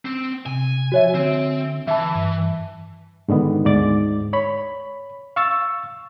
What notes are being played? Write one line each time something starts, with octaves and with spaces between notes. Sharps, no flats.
C4
C3 G#5
F3 F#4 C#5 E5
D3 C4
E3 E5 A5
G2
G#2 D3 D#3 B3
D2 G#2 D5 A6
C#5 B5
F5 C#6 E6 A6